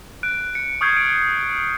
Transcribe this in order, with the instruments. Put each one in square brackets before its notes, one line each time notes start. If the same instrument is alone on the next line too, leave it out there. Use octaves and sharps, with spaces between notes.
[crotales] F#6 D7
C#7
C#6 D#6 F6 G6 G#6 C7
D7